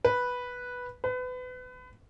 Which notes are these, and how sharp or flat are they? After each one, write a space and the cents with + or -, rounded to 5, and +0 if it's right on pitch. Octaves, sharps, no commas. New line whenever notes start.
B4 -5
B4 +30